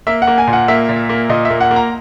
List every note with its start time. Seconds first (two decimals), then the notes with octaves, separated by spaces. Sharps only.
0.07 A#3 E5
0.22 F#5
0.27 A#3
0.38 G#5
0.47 A#2
0.53 F#5
0.68 A#3 E5
0.89 A#2
1.09 A#3
1.29 A#2 D#5
1.45 E5
1.50 A#3
1.60 F#5
1.71 A#3
1.76 A#5